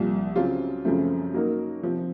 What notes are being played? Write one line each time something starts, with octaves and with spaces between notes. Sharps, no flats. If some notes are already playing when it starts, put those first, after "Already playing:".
Already playing: C2 A#2 F3
C#3 F#3 C4 F4
F#2 C#3 F3 A3 C4
F#3 A#3 D#4 F#4 A#4
C3 F3 C4